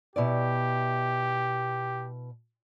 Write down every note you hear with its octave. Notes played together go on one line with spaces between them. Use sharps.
B2 E4 G4 D5